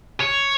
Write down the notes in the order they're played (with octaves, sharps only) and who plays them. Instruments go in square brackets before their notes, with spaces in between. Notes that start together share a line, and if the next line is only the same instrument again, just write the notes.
[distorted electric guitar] C#5